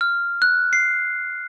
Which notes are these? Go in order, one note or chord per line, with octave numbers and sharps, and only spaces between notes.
F6
F#6
C7